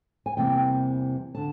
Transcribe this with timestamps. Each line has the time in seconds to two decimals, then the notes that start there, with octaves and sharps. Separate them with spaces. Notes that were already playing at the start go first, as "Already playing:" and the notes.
0.26 G#5
0.37 E2 C3 E3 G3 A#3 G5
1.35 D3 A5